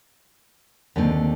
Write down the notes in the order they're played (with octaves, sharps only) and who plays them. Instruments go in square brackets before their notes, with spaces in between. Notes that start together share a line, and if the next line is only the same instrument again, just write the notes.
[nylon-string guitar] D#2 D3 A3 C4